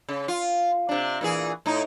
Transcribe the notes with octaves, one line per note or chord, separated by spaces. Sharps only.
C#3
F4
C3 D4
A#2 E3 G#4
A2 D#4